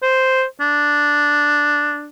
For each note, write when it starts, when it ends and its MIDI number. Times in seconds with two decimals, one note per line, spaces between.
0.03 0.44 72
0.60 2.09 62